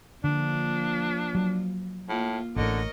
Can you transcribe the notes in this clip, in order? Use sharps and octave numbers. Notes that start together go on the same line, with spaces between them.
D3 F3 A#3 D4 F4
F#3
A2 A#3 F4
A1 A2 D3 A#4 C#5 D#5